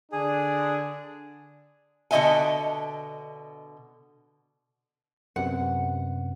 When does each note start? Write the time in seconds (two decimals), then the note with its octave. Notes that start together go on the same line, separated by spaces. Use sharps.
0.12 D3 D4 G#4
2.11 B2 D3 F#4 D#5 E5 G#5
5.36 F#2 C3 B3 F#5